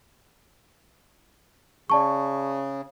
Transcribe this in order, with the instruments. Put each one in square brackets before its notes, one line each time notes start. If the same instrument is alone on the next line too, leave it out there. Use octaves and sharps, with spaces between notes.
[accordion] C#3 [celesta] D5 A5 C#6